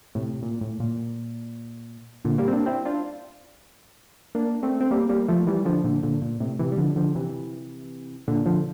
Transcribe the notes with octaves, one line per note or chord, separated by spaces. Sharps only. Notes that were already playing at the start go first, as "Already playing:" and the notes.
A2 C3
A#2
A2
A#2
A#2 D3
G3 A#3
C4
A#3 D4
C4 E4
D4 F4
A#3 D4
A3 C4
C4
G3 A#3
G3 A#3
F3 A3
E3 G3
D3 F3
A#2 D3
A#2 D3
A#2
A2 C3
C3 E3
G3
D3 F3
D3 F3
C3 E3
A#2 D3
D3 F3